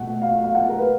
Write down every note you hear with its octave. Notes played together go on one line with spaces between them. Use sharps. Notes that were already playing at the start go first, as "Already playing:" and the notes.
Already playing: B2 A3 F#5
F5
F5
F#5
A#4
B4